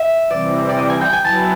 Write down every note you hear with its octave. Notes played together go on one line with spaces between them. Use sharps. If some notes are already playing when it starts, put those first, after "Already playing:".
Already playing: E5
C3 E3 G3 C4 D5
D5
D#5
G#5
G5
G#5
F#3 B3 E4 A5